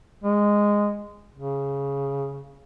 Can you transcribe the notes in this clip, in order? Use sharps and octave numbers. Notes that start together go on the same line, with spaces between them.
G#3
C#3